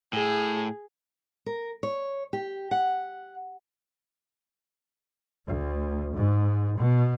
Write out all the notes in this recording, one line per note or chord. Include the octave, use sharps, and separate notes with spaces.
A2 G#4
A#4
C#5
G4
F#5
D2
G#2
B2